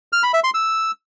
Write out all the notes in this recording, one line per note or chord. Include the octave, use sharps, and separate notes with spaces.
F6
B5
E5
C6
E6